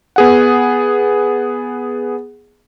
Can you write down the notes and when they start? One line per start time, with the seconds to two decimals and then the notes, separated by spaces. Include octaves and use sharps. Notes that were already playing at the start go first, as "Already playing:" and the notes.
0.16 B3 G#4 F#5